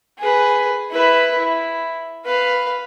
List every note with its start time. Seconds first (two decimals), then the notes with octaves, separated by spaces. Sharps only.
0.19 G#4 B4
0.91 E4 B4
1.38 E4
2.26 B4 F5